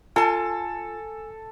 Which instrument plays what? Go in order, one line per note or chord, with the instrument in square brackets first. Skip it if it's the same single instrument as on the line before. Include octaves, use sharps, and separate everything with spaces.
[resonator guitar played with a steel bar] F4 A5 [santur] A4 [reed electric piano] G#5